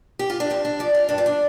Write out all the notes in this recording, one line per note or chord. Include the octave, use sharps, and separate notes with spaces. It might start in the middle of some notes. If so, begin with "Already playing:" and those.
G4
F4
D4
F2 C4
D4
F3 D5
F4
G2 D4
F4
D4